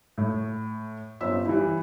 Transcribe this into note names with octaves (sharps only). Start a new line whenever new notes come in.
A2
G1 C4 C#4 F4 E6 B6
E3 G3 E4